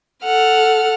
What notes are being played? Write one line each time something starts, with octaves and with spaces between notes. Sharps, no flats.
A4 F#5 F6